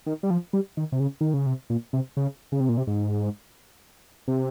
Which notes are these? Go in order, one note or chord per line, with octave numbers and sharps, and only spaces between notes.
D#3
G3
F3
G3
D#3
C3
C#3
D#3
C#3
C3
A#2
C3
C#3
C#3
C3
A#2
C3
G#2
C3